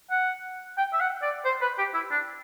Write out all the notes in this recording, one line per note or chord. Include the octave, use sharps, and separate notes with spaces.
F#5
G5
E5
F#5
D5
C5
B4
G4
E4
D4